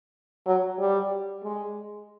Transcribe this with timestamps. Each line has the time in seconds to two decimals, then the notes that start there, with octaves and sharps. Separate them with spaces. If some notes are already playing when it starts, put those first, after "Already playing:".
0.47 F#3
0.80 G3
1.44 G#3